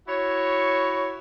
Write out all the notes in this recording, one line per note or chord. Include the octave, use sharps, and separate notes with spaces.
E4 F#4 C#5